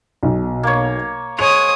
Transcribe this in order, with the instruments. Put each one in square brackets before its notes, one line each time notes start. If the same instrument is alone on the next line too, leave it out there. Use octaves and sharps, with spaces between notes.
[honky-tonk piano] B1 B2 F#4
[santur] A#3 C#5
[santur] G#3 [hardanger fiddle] C#5 D#6 [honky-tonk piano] F7